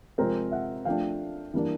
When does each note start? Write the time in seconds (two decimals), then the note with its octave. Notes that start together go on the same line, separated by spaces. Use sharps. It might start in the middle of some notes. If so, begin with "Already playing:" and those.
0.18 C3 F3 G#3 C4 A#4 C5
0.52 E5 F#5
0.85 F3 A3 D4 F5 G5
1.54 E3 G3 A#3 D4